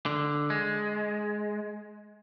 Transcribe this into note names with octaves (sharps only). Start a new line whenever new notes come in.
D3
G#3